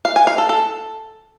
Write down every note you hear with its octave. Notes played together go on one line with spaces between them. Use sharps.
F5
G#5
F5
A4
A4